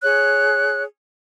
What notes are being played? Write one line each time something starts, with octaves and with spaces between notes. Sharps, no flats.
G#4 C#5 F#6